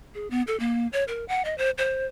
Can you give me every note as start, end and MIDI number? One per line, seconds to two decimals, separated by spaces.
0.15 0.30 68
0.31 0.42 59
0.47 0.58 69
0.60 0.87 58
0.93 1.04 73
1.08 1.25 70
1.28 1.44 78
1.45 1.57 75
1.58 1.70 72
1.78 2.06 72